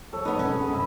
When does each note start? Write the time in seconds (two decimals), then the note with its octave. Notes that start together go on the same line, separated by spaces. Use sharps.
0.13 F3 A4 C#5
0.25 B3 D#4 B4 D#5 B5
0.39 E1 C#4
0.54 C#3 G#4
0.69 C2 G2 B5 E6